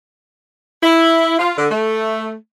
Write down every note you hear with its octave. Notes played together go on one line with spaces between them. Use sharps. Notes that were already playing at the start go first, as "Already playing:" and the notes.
E4
F4
D3
A3